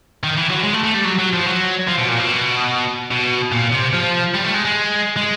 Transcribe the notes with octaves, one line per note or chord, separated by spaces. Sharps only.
D#3
E3
F#3
G#3
A3
A3
G3
F#3
F#3
F3
F#3
F3
B2
A#2
B2
B2
A#2
C3
F3
G3
A3
G#3
G#3
G#3